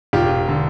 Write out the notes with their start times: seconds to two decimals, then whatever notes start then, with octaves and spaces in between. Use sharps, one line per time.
0.13 E1 F4 G4
0.49 D3